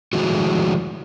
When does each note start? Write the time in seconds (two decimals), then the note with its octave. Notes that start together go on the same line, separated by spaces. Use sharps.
0.13 D#3 F3 G#3 A3 E4 F#4